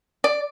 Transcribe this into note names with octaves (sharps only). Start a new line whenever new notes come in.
D5